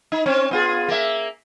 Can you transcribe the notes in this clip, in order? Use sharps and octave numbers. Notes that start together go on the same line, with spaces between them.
D#4
C4 C#4
B3 F4 G#4
A#3 E5